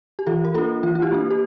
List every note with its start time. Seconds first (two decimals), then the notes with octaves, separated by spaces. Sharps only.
0.19 G4
0.27 E3 F4 A4
0.45 A#4
0.54 A#3 D4 F4 A4
0.83 E3 F4
0.95 F4
1.02 E4 G4
1.12 A#3 D4
1.30 G4